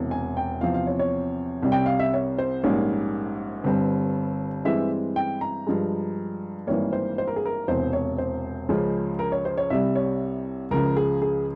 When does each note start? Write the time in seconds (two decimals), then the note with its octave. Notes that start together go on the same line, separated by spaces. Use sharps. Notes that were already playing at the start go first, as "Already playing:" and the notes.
Already playing: E1 E2 C3
0.11 G#5
0.37 G5
0.61 E2 C3 F3 C4 F5
0.74 F5
0.87 C#5
0.99 C#5
1.63 C2 C3 G3
1.72 G5
1.86 F5
2.00 E5
2.14 C#5
2.38 C5
2.64 A#1 G#2 G3 A#3 C#4 C#5
3.64 G1 G2 G3 C4
4.65 G2 E3 G#3 C4 E5
5.16 G5
5.41 A#5
5.67 G2 F3 G#3
6.67 G#1 G2 E3 G3 A#3 C#5
6.93 C5
7.18 C5
7.27 A#4
7.36 G#4
7.45 A#4
7.68 E1 E2 C3 C5
7.93 C#5
8.18 C5
8.69 C#2 C#3 F3 G#3 C#4
9.19 A#4
9.32 C#5
9.45 C5
9.58 C#5
9.70 C2 C3 G3 E5
9.95 C#5
10.71 C#2 C#3 F3 A#4
10.97 G#4
11.22 G#4